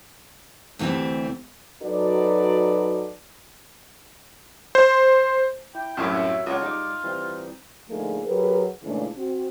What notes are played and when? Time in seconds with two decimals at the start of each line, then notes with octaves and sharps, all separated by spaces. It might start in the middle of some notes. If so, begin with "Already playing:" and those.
0.79 D2 C3 E3 G3 C4
1.83 F#3 D#4 F#4 A4 B4 D5
4.75 C5
5.75 E4 G5
5.97 C2 F#2 A2 C#4 C6 G#6
6.12 F#4 C#5 E5 F#5
6.46 C#2 F4 C#5 F#5
6.62 G3 D#4 D6
7.04 E3 G3 C4
7.89 D3 F3 A3 A#3 D#4 G#4
8.24 F#3 G4 G#4 A#4 B4
8.83 A#2 C#3 E3 G#3 A3 D4
9.16 C4 F#4